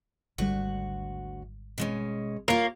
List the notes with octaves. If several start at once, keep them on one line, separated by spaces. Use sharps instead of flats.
G#1 D2 D3 G3 F#4 F#5
B2 G#3 C#4
A#3 F4 C#5